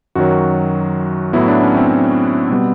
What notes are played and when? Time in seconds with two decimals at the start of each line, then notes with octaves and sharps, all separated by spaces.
0.15 F#2 D#3 F#3 F#4
1.33 A2 F#3 B3 E4
1.48 D4
1.63 C#4
1.77 C4
2.50 B2 G3 B3